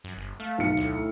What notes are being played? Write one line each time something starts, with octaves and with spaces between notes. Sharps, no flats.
F#2
G1
A3 F5
B1 C#7
D2 A2